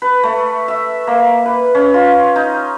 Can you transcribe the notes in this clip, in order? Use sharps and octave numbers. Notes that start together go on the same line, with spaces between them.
B4
A3
E5
A#3
B4
C#4
F4
D#4